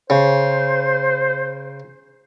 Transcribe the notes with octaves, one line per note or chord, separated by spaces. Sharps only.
C#3 C5